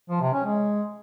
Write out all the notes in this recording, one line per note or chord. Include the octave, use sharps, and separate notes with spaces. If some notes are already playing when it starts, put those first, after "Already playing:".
F3
C3
C#4
G#3